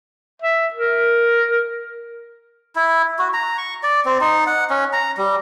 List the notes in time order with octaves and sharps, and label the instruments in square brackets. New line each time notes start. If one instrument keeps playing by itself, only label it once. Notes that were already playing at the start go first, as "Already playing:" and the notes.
[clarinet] E5
A#4
[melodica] E4
F#4
A#5
C#6
D5
C4
D#4
F#5
C#4
A#5
G3